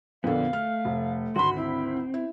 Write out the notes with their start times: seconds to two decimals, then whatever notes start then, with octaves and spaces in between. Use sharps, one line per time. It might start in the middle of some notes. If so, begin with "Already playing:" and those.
0.24 F2 A#2 D3 B3 F5
0.53 A3 F6
0.85 F1
1.36 G#1 D2 F#4 B5 C6
1.57 C4 E4
2.14 E4